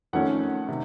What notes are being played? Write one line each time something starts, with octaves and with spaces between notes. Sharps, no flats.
F2 D#3 A3 C#4 F#5
C3 D#3